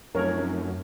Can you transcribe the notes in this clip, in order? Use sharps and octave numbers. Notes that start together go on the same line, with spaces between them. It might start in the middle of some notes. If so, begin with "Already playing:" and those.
F1 F#2 A3 D#4 A4 A#4 C#5